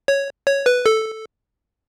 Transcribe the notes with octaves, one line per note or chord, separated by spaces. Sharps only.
C#5
C#5
B4
A4